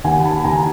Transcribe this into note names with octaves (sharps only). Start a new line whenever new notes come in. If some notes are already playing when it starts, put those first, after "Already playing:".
D#2 F#5 G#5
A5 B5
D#2 G#5 A#5